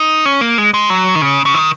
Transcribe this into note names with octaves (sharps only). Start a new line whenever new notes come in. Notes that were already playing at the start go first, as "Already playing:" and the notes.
Already playing: D#4
C#4
A#3
G#3
G#3
F#3
D#3
C#3
C#3
D#3